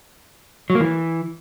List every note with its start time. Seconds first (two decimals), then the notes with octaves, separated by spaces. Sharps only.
0.70 F#3
0.75 A#3
0.80 E3